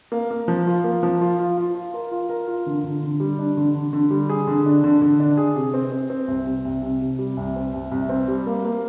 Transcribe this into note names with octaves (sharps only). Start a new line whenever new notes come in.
A#3
A#3
F3
F4
A#3
F3
F4
F4
F4
F4
A#4
F4
A#4
F4
D3
D3
D3
G3
D4
D3
D3
D3
G3
G#4
D3
D4
D3
D3
D4
G#4
C3
C4
C4
C4
C2
C3
C2
C3
C3
G3
C2
C4
C2
C2
C4
G3
A#3
A#3